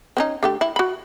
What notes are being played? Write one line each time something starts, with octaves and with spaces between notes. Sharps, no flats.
C4 C#4 D#4
D3 A3 G4
E4
F#4 B5